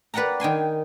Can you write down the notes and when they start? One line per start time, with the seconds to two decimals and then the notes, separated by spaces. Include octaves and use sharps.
0.14 B4 D5 F#5 G5 A#5
0.40 D#3 G5 G#5 C6